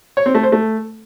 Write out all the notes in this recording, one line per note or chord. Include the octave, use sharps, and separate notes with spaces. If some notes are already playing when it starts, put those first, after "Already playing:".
C#5
C4
A3
C5
A3